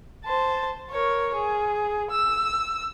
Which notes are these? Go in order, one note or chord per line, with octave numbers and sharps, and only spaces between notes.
C5 A5
A#4 C#5
G#4
E6